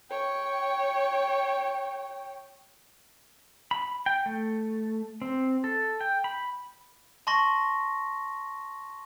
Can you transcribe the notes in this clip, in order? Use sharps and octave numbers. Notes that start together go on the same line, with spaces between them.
C#5 G5
B5
G5
A3
C4
A4
G5
B5
A5 C6 C#6 A#6